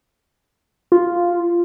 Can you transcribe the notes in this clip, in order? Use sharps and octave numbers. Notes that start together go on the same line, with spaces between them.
F4